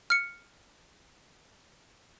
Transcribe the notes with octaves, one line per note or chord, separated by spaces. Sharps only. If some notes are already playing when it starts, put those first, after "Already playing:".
F6 C#7